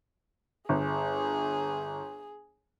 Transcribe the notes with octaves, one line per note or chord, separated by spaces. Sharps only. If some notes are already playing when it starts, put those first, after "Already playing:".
G1 G#4